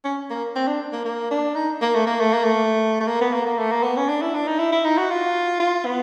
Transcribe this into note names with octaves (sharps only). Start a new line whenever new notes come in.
C#4
A#3
C4
D4
A#3
A#3
D4
D#4
A#3
A3
A#3
A3
A#3
A3
A3
A#3
B3
A#3
A#3
A3
A#3
B3
C#4
D4
E4
D4
D#4
E4
E4
D#4
F#4
F4
F4
B3